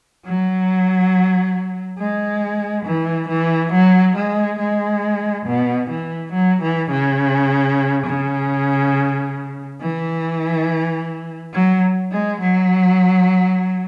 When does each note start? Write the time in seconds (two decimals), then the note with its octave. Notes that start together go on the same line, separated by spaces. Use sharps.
0.25 F#3
1.98 G#3
2.85 E3
3.29 E3
3.72 F#3
4.16 G#3
4.59 G#3
5.46 B2
5.90 E3
6.33 F#3
6.62 E3
6.91 C#3
8.06 C#3
9.81 E3
11.54 F#3
12.11 G#3
12.41 F#3